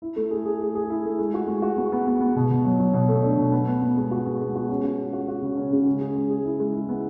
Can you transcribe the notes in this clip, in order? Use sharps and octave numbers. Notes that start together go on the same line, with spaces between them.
E4
A3
G#4
G#4
G#4
G#4
E4
A3
G#3
F#4
G#3
F#4
B3
B3
B3
B3
B2
B2
F#3
F#3
B2
A3
D4
B2
B3
B3
B3
G#3
F#4
B3
G#3
F#4
C#4
F#4
G#3
F#4
F#4
C#3
C#4
C#3
G#3
G#4
G#3
G#4
E4
G#3
E4
B3